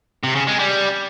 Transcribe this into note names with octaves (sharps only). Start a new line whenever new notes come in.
C3
C#3
G#3
G3